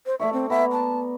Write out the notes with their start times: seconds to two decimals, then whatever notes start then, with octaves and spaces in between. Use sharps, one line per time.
0.06 C5
0.20 A3 D5 E5 C#6
0.33 C4
0.50 B3 E5 A#5
0.72 A5